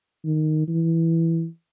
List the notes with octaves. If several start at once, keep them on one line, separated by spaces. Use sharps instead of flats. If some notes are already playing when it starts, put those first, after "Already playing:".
D#3
E3